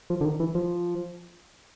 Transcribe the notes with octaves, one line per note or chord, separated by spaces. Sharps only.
F3
D3
D#3
E3
F3